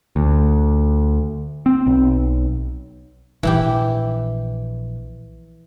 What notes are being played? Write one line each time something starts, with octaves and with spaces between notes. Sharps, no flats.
D2
C4
B1
A#1 E3 E4 G4